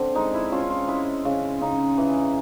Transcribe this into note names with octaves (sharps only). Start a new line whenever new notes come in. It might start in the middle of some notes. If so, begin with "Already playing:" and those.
Already playing: D3 C4
G#3 D#4
E4
C#4 F4
F4
G#3 E4
C#3
C#3 D#4
E3